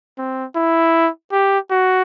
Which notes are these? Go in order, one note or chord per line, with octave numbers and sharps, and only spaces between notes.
C4
E4
G4
F#4